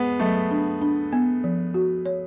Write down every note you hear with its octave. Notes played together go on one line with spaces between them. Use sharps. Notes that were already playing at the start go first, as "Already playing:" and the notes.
Already playing: G#3 B3
F#3 A3
D4
D4
B3
F3
F#4
C#5